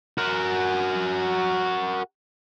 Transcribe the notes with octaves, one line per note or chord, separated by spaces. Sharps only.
F#4 A#4